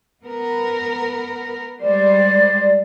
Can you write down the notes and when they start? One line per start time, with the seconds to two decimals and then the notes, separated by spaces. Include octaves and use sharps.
0.24 B3 A#4
1.82 G3 G#3 C5 D5